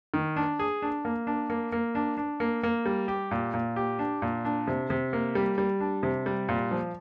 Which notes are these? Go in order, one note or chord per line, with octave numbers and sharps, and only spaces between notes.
D#3
D4
G#4
D4
A#3
D4
A#3
A#3
D4
D4
A#3
A#3
G3
G4
A#2
A#2
G4
D4
A#2
D4
C3
C3
A#3
G3
G3
D4
C3
G3
A#2
F3